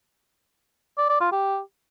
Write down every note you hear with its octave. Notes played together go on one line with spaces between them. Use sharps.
D5
D5
F4
G4